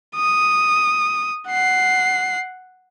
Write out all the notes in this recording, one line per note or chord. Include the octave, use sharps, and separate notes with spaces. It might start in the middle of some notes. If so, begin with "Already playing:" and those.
D#6
F#5 C7